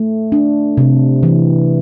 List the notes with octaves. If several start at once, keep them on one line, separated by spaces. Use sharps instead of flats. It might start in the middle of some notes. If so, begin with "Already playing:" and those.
Already playing: A3
D4
C3
E3